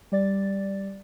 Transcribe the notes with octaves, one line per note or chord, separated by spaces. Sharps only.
G3 D5 A6